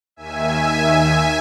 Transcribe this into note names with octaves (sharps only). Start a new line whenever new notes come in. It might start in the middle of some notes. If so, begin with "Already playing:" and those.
D#2 D#3 E5 G#5
D#2 D#3